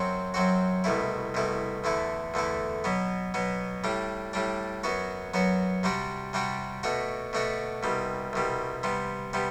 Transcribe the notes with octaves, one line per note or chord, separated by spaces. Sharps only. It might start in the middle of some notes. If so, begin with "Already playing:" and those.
Already playing: F#2 F#3 C4 F#4
F#2 F#3 C4 F#4
C2 B2 A3 E4
C2 B2 A3 E4
E2 D3 A3 E4
E2 D3 A3 E4
B2 F#3 B3
B2 F#3 B3
A2 G3 D4
A2 G3 D4
F#2 F#3 B3 F#4
F#2 F#3 B3 F#4
C3 G3 D4 F#4
C3 G3 D4 F#4
B2 A3 D4 F#4
B2 A3 D4 F#4
C2 B2 G3
C2 B2 G3
C3 G3 B3
C3 G3 B3